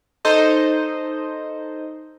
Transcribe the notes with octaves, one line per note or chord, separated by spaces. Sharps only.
D#4 A4 C5 D#5